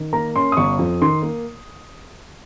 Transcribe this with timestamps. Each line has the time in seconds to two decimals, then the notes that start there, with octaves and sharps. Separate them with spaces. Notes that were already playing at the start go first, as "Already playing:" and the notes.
Already playing: D#3
0.13 A#3 A#5
0.35 C#4 C6
0.52 D#6
0.57 G1 C#6
0.79 F2
1.02 D#3 C6
1.22 A#3